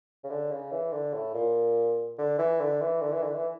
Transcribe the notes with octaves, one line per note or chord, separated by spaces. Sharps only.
C#3
D3
C#3
E3
D3
A2
A#2
D3
E3
D3
E3
D3
E3
D3
E3